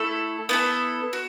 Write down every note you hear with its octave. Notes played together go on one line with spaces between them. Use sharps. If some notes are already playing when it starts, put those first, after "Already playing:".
Already playing: A3 E4 A4
B3 E4 A4
F#4